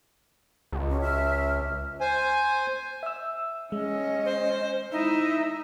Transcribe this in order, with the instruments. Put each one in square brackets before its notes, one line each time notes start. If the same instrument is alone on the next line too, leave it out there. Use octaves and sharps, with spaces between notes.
[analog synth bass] C#2
[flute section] C#4 F#4
E5 F6
[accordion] C5 G#5
[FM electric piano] E5 E6
[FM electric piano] G#3 [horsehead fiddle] C#4 D#5
[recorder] C5
[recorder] D#4 [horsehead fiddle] E4 E5